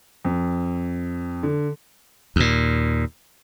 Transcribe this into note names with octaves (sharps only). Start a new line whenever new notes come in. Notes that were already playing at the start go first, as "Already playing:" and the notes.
F2
D3
D#2 A#2